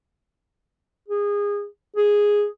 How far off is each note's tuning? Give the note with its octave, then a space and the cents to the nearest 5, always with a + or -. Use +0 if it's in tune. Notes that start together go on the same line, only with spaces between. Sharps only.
G#4 -25
G#4 -5